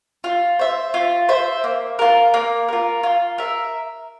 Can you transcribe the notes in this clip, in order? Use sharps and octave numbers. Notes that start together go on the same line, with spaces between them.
F4
C5 E5
F4
C5 E5
A#3
F4 A#4
A#3
F4 A#4
F4
A#4 E5